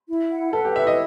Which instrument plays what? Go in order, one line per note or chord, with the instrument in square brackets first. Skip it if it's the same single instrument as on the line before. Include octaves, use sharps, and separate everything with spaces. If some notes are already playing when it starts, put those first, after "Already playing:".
[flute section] E4
F#5
[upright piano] A4 [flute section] B4
[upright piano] G4
[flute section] E4 [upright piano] E5
[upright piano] D#5